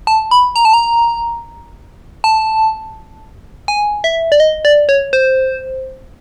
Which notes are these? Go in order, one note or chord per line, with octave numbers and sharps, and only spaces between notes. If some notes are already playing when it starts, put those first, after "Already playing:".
A5
B5
A#5
A5
A#5
A5
G#5
E5
D5
D#5
D5
C#5
C5